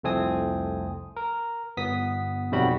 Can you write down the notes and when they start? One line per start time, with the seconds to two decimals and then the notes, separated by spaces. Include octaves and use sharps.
0.03 C2 F2 A3 C4 G#5 D#6
1.16 A#4
1.77 G1 B3 D#6 B6
2.51 B1 F2 C3 G3 F#4 B5